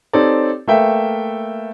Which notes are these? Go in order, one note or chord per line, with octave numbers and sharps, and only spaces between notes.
C4 D#4 G4 A4 C#5 D5
A3 A#3 B4 E5 F5 G5